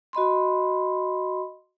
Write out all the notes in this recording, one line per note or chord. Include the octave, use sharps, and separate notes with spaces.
F#4 D#5 B5 C6